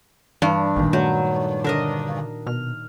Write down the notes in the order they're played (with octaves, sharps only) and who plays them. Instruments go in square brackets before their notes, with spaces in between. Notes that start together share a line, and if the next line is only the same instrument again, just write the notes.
[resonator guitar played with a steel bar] G2 [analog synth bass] E3 [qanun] D4
[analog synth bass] A1 [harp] A#2 D#3
[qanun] F#3 [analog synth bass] A3 [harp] G6
[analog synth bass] D3 [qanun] D4 A#4 D#5
[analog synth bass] B2 [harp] F6